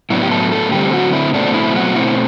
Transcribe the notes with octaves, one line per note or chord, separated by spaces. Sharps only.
A2 F#3 B3 D4 E4
G4
A3 A4
A3 A4
D3 G3 A3 C4 G4
F#3 F#4
E4
B2 A3 C4 D4
E4
F#3 F#4
B2 A3 C4 E4